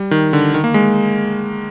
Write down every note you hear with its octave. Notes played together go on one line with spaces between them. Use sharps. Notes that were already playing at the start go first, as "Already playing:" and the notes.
Already playing: G3
D#3
D3
D#3
A#3
G#3